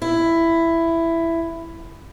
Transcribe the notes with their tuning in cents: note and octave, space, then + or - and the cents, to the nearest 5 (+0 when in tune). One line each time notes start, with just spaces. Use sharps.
E4 +10